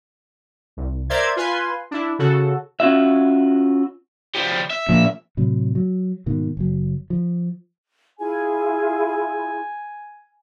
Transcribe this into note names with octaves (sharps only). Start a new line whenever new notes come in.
C2
A#4 C5 D5 E5 C6 G#6
F4 B4 G#5 C6
D4 E4
C#3 F#4 A4
C#4 F4 F#4 E5
F3 G3
E5
A#2 F3
A2 C3 F#3
F#3
G#2 B2 D#3
F#1 F#3
F3
E4 F4 G#4 G#5